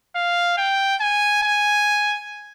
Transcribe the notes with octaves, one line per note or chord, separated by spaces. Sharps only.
F5
G5
G#5
G#5